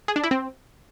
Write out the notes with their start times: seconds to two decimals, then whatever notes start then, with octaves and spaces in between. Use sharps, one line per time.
0.08 G#4
0.16 D4
0.23 E4
0.31 C4